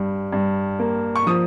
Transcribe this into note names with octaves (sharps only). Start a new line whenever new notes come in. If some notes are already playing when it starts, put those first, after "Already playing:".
Already playing: G2 G3
G2
A#3
C#6
F3 D#6